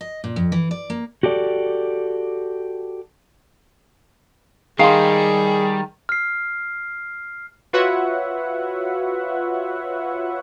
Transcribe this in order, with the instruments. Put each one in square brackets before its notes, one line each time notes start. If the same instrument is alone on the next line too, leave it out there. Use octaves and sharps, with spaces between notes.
[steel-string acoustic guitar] D#5
A#2
F2
E3
D5
A#3
[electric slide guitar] F#4 G4 A4 D5
[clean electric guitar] D#3 [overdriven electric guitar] G3 [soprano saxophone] G#4 [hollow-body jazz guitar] F5 C6
[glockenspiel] F6 C7
[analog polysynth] F4 F#4 B4 C#5 E5 F#5